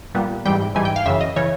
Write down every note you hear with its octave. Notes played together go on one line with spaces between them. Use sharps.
A#2 G3 B3
G#2 E3 G3 G5
G#2 E3 G3 G#5
G5
F5
F#2 C#3 E3 E5
D#5
C#3 E3 C#5